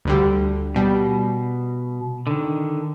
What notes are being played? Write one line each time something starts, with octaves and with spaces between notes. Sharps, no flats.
D2 D3 G3
B2 G3
D3 D#3